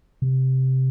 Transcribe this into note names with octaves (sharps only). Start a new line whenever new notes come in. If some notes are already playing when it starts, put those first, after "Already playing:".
C3